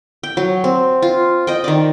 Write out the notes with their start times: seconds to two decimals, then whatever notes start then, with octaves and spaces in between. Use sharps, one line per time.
0.23 G5
0.37 F#3
0.64 C4
1.02 F4
1.47 D#5 G5
1.64 D#3 D5